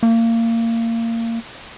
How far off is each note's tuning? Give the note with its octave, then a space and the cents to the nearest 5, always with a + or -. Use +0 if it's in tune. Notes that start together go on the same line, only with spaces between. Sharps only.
A#3 -25